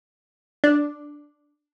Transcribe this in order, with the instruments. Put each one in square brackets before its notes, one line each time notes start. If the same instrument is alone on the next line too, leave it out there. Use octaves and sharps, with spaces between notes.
[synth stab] D4